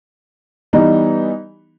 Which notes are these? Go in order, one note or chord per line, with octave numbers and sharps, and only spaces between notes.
E3 G3 B3 D#4